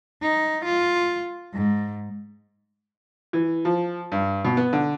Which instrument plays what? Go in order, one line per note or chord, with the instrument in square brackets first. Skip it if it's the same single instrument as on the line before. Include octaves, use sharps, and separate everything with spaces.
[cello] D#4
F4
G#2
[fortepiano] E3
F3
G2
B2
B3
D3